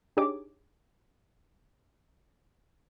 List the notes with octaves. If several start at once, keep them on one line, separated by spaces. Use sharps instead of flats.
D4 D#4 G4 G#4 C#5 D6